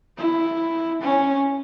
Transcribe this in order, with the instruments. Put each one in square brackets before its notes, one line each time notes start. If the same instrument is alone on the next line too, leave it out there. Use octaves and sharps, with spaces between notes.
[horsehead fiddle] E4
C#4